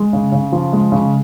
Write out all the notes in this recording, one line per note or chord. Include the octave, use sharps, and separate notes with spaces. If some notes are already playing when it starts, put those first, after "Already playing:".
Already playing: G#3
C#3
C#3
F3
G#3
C#3